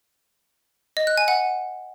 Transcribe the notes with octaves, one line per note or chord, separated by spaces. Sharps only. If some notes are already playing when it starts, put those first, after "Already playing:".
D#5
F#6
G#5
F#5